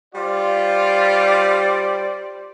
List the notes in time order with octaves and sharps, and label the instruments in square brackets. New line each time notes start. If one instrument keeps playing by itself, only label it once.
[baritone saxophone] G3 [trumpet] F4 [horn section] C5 D5